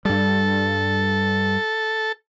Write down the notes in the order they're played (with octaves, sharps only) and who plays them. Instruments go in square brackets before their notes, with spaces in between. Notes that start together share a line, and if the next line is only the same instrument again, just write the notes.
[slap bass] G2 G3 [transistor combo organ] A4